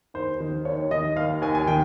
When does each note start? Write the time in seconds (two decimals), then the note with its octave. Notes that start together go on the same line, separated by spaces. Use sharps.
0.14 D#2 C5
0.40 D#3
0.65 D#2 C#5
0.91 D#3 D#5
1.16 D#2 F5
1.42 D#2 G#5
1.55 G#5
1.67 D#3 G5